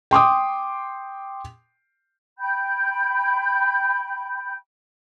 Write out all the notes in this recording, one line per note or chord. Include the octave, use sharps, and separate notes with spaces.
G5 C6 D6 D#6
G5 B5 G6